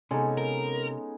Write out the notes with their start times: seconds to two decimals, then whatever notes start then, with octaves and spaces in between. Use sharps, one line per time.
0.11 C3 G#3 B3 C#4 D#4 A4
0.37 A#4